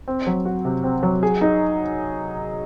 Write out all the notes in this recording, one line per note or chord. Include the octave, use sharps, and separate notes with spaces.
C4
F#3
F#4
C3
C4
F#3
G#4
D#4